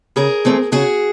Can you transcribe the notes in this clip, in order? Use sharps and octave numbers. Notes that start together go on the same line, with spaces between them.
C#3 G#4 A#4
E3 A3 C4
C#3 F#4 G#4